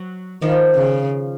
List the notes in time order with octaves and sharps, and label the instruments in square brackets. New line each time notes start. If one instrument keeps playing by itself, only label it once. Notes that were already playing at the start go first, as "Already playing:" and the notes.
Already playing: [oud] F#3
[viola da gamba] D#3 [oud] F3
[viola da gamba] C#3